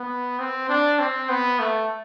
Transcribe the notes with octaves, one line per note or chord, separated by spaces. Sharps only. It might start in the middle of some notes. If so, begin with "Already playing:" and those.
Already playing: B3
C4
D4
C4
B3
A3